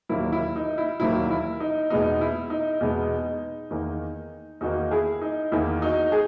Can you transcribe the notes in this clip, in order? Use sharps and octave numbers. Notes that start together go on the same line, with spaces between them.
E1 D#2 D#3 F#3 A#3 E4
E4
D#4
E4
E1 D#2 D#3 F#3 A#3 E4
E4
D#4
E2 B2 G#3 B3 D#4
E4
D#4
E2 B2 G#3 B3
E2 D#3 A#3
E2 D#3 A#3 D#4 F#4
E4 G#4
D#4
E2 D#3 A#3 E4
D#4 F#4
G#4